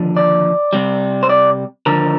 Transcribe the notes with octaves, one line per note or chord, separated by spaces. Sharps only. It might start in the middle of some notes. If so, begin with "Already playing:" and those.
Already playing: D#2 D3 F3
D5
C2 C3 G3
C5
D5
D#2 D3 F3 A#4